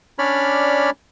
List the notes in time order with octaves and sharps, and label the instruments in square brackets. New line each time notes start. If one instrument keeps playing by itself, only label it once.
[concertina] C#4 D4 C#5 D5 B5 F6